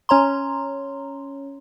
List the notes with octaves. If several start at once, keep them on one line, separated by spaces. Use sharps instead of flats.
C#4 C#5 A#5 C6